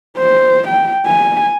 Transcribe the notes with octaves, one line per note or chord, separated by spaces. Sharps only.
C5
G5
G#5